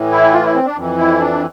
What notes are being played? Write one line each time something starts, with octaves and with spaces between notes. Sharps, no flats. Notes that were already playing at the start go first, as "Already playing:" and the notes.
Already playing: A2 E3
E4
F4
E4
C4
D4
F2 E3
E4
D4